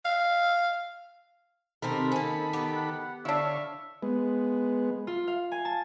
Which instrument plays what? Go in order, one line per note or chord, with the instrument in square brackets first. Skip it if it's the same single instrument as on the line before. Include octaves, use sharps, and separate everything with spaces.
[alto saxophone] F5
[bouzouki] C3 C4 A#4 [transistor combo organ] D#3 A4 B5
[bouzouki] A#3 C#4
B3 G4
[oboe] F#5
[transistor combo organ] D3 C#5 F5 [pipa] D4 E4 [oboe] E5
[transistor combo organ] G#3 B3
[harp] F4
F5
G#5
A5